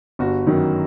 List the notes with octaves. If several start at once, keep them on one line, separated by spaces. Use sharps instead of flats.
G1 F#4
F#2 D#3